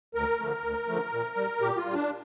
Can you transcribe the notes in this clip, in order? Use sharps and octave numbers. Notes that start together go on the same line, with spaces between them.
D2 A#4
D3 F3 A3
D2
D3 F3 A3
A#2
G3
A#2 G4
F4
G3
D4